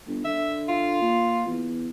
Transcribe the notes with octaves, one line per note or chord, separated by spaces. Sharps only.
G1
D3 E5
F4
A#2
E2